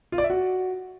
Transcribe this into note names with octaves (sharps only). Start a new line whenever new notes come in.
F4
D5
E5
F#4